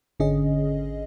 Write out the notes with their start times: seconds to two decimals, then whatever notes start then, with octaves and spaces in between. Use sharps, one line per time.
0.20 G#1 D3 C#4 G#4 D#5